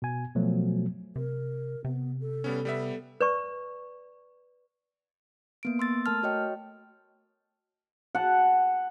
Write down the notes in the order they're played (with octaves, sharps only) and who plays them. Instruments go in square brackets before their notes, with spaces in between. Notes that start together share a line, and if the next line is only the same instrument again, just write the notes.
[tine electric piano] B2 G#5
B2 F3 F#3 A3
[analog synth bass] C3 [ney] A#4
[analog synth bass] C3 [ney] B3
[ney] A4
[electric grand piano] G3 B3 C#4
G3 B3 E5
[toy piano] B4 D5 C#6
[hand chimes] A#3 B3 D7
C6 E6 A6
A3 A#4 A5 F6
F#4 C#5 D#5 G5
[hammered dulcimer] F#5 A5